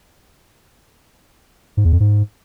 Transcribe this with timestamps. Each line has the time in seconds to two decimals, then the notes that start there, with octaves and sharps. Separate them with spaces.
1.77 G#2
1.85 E2
1.93 F2
2.00 G#2